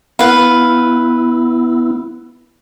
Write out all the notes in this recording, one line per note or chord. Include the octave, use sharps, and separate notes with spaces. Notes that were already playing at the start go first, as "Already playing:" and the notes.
B3 E4 B4 F5